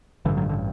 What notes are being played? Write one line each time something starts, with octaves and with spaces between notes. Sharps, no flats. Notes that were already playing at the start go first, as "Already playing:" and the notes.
A1 G2 D3 E3
F#3
D3